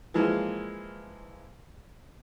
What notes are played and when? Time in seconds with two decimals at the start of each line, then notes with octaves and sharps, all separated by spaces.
0.14 E3 F3 G#3 A#3